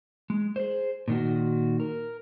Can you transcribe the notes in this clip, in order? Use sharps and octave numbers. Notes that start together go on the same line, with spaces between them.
G#3
G#4 C5
A#2 D#3 F#4
A#4